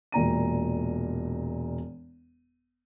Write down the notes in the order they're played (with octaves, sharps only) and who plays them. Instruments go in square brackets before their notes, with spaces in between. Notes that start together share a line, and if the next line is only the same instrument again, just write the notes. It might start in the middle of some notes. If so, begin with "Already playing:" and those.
[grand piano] E1 A#2 A#5 D#7